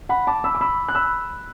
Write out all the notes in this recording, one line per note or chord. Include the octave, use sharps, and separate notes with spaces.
F#5 B5
A5 D6
B5 E6
D6
B5 E6
F#6
B5 E6